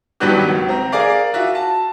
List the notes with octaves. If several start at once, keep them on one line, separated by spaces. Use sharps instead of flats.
G2 D#3 F#3 B3 F#4 G4
C#2
C4 A#5
G#4 A#4 D5 F5
F4 F#4 E5
A5